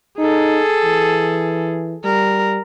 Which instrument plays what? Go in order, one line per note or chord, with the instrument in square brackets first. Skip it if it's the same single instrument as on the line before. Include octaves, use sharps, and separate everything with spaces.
[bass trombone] D#4 [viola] G#4 A4
[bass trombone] E3
[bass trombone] G3 [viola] A#4